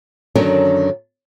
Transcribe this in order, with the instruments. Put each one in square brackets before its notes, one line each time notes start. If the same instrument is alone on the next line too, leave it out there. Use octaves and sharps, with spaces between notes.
[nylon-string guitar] F#2 D3 D#3 F#3 C#4 D4